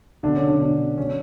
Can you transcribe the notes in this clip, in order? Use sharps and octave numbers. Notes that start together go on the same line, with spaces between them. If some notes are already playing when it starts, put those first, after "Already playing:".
B2 D3 D4
C#4
F#3
D3 D4
B2
F#3
B2 C#4